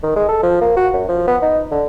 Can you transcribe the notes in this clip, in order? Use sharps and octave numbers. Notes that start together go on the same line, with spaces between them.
D#3
G#3
A4
F3
A#3
F#4
F#2
F3
B3
D#4
D3